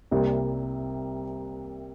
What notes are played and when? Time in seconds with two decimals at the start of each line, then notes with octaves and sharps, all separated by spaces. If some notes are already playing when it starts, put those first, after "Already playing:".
0.11 C2 C3 G3 A#3